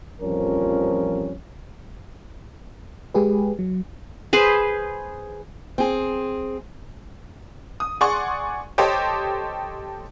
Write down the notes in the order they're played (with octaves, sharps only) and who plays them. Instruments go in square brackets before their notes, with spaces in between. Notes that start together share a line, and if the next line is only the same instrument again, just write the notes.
[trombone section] A1 F2 F3 G3 C#4 A#4
[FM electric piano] G#3 G4 G#4 B4
F#3
[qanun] G#4 B4 C5
[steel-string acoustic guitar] C4 G#4
[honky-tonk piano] D#6
G#4 D5 F#5 C6 C#6
G4 A4 C5 C#5 D#5 G5